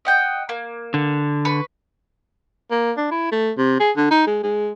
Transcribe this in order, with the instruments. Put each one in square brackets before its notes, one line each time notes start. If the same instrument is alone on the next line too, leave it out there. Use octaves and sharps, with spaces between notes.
[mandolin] D#5 F#5 G5
A#3
[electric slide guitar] D3
[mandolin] B4 C#6
[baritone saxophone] A#3
D4
E4
A3
C3
G#4
D3
D#4
G#3
G#3